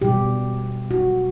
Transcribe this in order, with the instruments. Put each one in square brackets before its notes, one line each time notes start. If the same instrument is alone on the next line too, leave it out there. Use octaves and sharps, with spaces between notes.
[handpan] B2 G3 G4
F#4